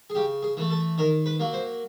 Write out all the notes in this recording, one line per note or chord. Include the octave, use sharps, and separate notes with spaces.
G#4
C#3 G4
G#4
E3 A3
A4
D#3 A#4
B4
F#3 A#3
C5